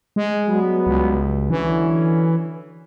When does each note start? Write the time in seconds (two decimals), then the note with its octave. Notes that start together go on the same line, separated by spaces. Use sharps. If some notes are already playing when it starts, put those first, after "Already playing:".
0.16 G#3
0.48 F#3 G3 B3
0.87 C#2
1.50 D3 E3 F#3 C#4